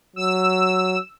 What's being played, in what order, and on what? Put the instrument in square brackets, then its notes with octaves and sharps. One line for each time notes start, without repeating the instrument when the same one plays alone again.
[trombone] F#3 [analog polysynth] E6